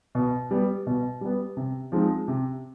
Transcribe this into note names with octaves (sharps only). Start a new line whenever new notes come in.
B2
G3 B3
B2
G3 B3
C3
F3 G#3 C4 D#4
C3